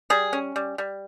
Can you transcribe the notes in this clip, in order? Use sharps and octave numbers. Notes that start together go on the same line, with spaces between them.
G3 G#4
C#4
G3
G3